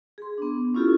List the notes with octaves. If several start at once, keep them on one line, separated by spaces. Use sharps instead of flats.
G#4 C6
B3 D4
C#4 E4 F4 G4 A4